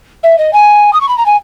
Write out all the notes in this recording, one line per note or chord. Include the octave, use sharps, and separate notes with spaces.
E5
D#5
G#5
D#6
C#6
B5
A#5
G#5